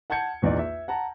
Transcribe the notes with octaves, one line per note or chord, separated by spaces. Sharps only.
F#5 A5 G6 G#6 C#7
A#1 E2 D#4 D5
E5
F#5 A5 A#5